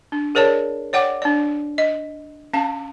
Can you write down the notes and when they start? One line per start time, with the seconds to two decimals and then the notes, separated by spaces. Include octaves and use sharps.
0.12 D4
0.35 G#4 A#4 C#5 D5 A5
0.93 C#5 D5 F#5 G5 D6
1.22 D4 D5
1.78 D#5
2.53 C#4 F5 A5